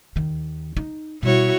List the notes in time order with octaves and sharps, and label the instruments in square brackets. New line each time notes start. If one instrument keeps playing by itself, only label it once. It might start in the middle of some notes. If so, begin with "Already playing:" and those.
[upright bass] D#2 D#3
D#4
[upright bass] B2 G3 [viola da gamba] E4 F#4 C#5